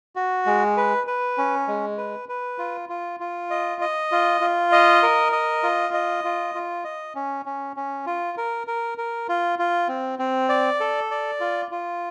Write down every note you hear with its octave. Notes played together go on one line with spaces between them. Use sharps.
F#4
G#3
B4
B4
C#4
G#3
B4
B4
F4
F4
F4
D#5
D#5
F4
F4
D#5
A#4
D#5
F4
D#5
F4
F4
D#5
C#4
C#4
C#4
F4
A#4
A#4
A#4
F4
F4
C4
C4
D5
A4
D5
F4
F4